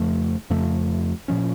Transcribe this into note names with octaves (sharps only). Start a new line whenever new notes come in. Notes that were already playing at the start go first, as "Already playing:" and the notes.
Already playing: F2 C#3 F3 A3
F2 C#3 F3 A3
A#2 F3 C#4